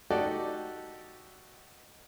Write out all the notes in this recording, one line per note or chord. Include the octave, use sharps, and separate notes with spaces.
D#4 F#4 G4 A4 D5